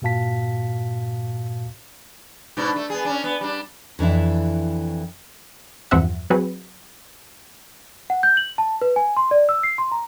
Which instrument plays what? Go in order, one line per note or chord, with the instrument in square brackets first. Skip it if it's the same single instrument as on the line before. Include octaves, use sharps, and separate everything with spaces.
[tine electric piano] G2 A#2 F#4 F5 A5 B6
[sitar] G#2 B2 D4
A3
B3 G#4
C#4 D4
B3
G3 D4
[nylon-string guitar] F2 E3 D4 E4
[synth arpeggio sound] E2 G2 F3 C4 E5 F#5
F#3 C4 F#4 G#4 B4
[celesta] F#5
G6
F#7
A5
B4
G#5
C6
D5
E6
C7
C6
A#5